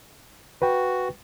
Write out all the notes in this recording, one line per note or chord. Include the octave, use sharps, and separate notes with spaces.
F#4 B4 G5